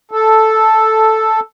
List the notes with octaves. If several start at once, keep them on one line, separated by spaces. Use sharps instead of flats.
A4